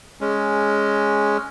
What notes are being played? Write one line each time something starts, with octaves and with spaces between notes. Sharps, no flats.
G#3 C#4